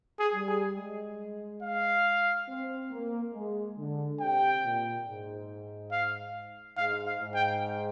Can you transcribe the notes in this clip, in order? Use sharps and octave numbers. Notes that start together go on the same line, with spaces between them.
G#4
G3
G#4
G#3
F5
C4
A#3
G#3
D3
C3 G5
A#2
G#2
F5
G#2 F5
F5
G#2
G5